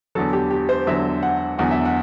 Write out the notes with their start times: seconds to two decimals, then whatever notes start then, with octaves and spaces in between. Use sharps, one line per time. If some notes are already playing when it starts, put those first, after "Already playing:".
0.15 E2 D3 F#3 A4
0.33 G4
0.50 G4
0.69 C5
0.87 E2 D3 F#3 E5
1.23 F#5
1.58 E2 D3 F#3 F#5
1.71 E5
1.85 F#5